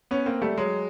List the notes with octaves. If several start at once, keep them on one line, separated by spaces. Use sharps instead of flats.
B3 C#4
A#3 C4
G3 A3
F#3 G#3